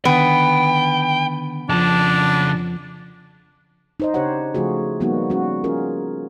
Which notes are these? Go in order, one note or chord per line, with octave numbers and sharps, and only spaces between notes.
D3 D#3 B3 G5
F2 C#3 F3 D4 A5
D#4 C5 D#5
C#3 D4 G4 C5 C#5 F#5
C#3 F3 A3 F4 F#4 G#4
F3 G3 A#3 B3 D#4 F#4
G3 C#4 F#4
C#4 F4 G#4 A#4